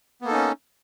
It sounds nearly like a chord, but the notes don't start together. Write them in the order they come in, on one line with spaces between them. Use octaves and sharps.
B3 A#3 A4 D#4 C#4